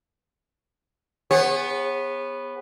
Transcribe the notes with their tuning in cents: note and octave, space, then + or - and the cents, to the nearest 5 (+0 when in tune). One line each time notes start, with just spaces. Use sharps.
B3 +0 G#4 -35 C#5 -40